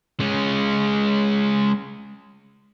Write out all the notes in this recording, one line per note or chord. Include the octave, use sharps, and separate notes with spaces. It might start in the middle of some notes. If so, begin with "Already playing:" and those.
G#3 C#4